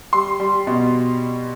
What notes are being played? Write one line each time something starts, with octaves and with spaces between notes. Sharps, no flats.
G3 C6
G3
B2